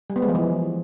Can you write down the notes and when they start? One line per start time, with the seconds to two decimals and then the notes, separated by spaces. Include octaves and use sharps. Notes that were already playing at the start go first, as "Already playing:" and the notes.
0.10 G3
0.16 B3
0.22 G#3
0.29 F3
0.35 E3